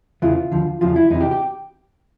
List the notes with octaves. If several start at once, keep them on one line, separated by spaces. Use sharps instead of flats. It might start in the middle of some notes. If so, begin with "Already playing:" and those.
E2 C#3 E3 F4
D#2 D3 F3
E2 C#3 F3 F4
E4
E2 C3 E3 D#4
G4
G4